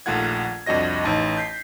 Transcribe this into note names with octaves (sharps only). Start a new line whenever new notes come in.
A#1 D#2 A3 F4 F#5 G#6
C2 F2 D4 F#4 D#5 A#6
A1 D#4 A5 C6
G6 B6 C7